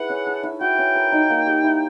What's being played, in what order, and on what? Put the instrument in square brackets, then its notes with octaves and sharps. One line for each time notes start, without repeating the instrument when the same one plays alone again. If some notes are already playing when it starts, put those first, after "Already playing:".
Already playing: [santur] E4 G#4 B4 [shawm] F#5
[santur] C#4
A4
E4
[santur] F#4 [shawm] G5
[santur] C#4
A#4
D#4
A#3
G4
E4